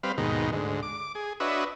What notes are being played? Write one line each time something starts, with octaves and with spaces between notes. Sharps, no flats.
G3 C4 B4 F5
D#2 G#2 B2 D#3
D2 G#2
D6
G#4
D4 F#4 B4 C#5 D#5 E5